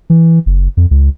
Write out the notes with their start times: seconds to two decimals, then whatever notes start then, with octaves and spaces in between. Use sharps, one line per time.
0.10 E3
0.46 F#1
0.77 F2
0.91 C#2